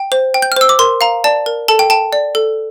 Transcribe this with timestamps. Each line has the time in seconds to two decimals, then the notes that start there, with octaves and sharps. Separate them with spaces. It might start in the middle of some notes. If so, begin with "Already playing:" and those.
Already playing: G5
0.12 C5
0.34 G5
0.42 G6
0.52 F6
0.56 C5 E6
0.69 D6
0.79 A#4 C6
1.01 F5 A#5
1.24 D5 A5
1.46 A#4
1.68 A4 A5
1.79 G5
1.90 G5 A5
2.13 D5
2.35 A4